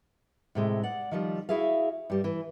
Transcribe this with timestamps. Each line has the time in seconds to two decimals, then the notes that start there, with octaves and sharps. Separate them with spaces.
0.55 A2 C3 G#3
0.83 D5 F#5
1.11 D#3 F3 G3
1.49 E4 F#4 G#4 E5 F5
2.10 G2 G3
2.24 E3